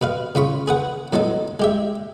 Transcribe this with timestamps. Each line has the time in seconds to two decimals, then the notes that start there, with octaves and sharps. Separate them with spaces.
0.01 B2 B4 F5
0.35 C#3 F4 B5 C#6
0.68 G#4 B4 F#5
1.13 A2 F#3 B3 D#4 A4
1.60 G#3 G4 E5